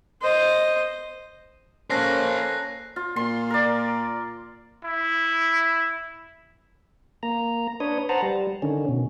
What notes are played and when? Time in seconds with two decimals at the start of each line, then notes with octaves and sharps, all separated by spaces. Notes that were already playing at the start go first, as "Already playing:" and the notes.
0.21 C5 D#5
1.90 A#3 C#4 A4 A#4 C5 F#6 A#6 C7
2.96 F4
3.16 A#2 C6
3.50 A#4 D5
4.84 E4
7.23 A#3 A#5
7.80 D4 B4 C#5 D#6
8.09 B4 C5 F#5 A5 A#5
8.22 G3
8.62 D3 D#3 C#4
8.89 B2